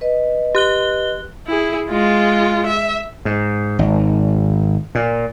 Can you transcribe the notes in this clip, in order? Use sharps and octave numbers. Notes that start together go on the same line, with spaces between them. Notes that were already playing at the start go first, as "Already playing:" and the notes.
B4 D#5
G4 F#6 G7
E4 G#4
G#3 F4
E5
G#2
G#1
A#2